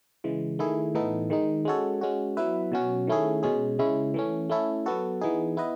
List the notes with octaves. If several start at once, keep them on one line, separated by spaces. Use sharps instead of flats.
C#3 E3 G#3
D#3 A3 E4 G#4
A2 E3 B3 D#4 A4
D#3 G#3 D#4
G#3 C#4 F#4 A4 C#5
G#3 C#4 F#4
F#3 B3 E4 B4 E5
B2 F#3 C#4 F#4
D#3 A3 C#4 E4 G#4
B2 G#3 C#4 G#4
C#3 G#3 C#4 E4
E3 A3 C#4
A3 C#4 E4 A4
F#3 B3 F#4 A4
E3 B3 D#4 G#4
B3 E4 B4 D#5